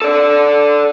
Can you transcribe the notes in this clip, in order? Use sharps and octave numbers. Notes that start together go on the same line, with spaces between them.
A4 D5